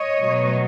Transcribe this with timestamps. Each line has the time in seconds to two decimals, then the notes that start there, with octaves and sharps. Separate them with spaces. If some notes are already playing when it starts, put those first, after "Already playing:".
Already playing: C#5 D#5
0.21 B2 F#3 A3